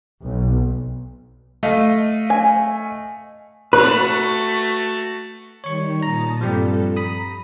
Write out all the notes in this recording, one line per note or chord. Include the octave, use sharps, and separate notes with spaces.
B1
A3 D#5 F5
G#5
A3 F#4 B4
D#3 G3 C#5 C#6
A#2 A5 A#5 D#6
G2 F3 G3 C4 A4
A#5 B5 D#6